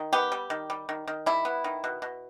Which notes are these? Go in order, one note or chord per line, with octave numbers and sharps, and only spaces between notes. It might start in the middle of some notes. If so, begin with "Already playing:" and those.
Already playing: D#3
B3 G4
G3
D#3
G3
D#3
D#3
G3 E4
B3
D#3
B2
B2